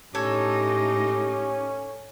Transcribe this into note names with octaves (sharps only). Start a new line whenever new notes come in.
A2 C#4 D#4 G4 A4 C#5